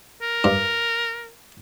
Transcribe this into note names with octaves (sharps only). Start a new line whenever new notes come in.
A#4
G2